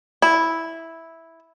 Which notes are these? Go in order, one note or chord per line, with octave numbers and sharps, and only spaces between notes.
E4